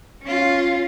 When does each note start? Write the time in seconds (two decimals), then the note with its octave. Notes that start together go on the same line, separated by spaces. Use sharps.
0.23 C#4 F4